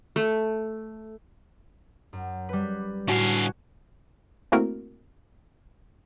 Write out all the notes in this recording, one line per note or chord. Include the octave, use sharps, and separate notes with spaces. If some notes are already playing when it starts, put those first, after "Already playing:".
A3
F#2
G3 B4
A2 D3 F#4 F5 G#5
A3 A#3 C4 E4 F#4 A#4